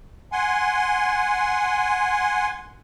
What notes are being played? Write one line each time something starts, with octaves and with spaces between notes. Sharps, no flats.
F#5 G#5 C6